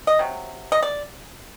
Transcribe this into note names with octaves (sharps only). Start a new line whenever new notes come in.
D#5
C3 F#3
D#5
D5